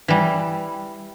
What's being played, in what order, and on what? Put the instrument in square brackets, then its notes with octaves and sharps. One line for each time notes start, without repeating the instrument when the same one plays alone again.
[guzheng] E3 G3